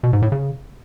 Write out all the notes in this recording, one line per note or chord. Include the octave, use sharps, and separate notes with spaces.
B2
G#2
A2
C#3